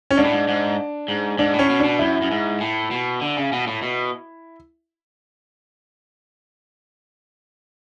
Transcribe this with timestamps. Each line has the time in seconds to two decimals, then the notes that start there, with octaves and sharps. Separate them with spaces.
0.11 C#4
0.17 G#2 D4
0.24 A2
0.32 G#2
0.48 G#2
1.08 G#2
1.38 G#2 D4
1.54 A2
1.59 C#4
1.69 B2
1.80 B2 D4
1.99 F#2 E4
2.22 F#2
2.31 G#2
2.60 A2
2.91 B2
3.21 D3
3.37 C#3
3.52 B2
3.67 A2
3.82 B2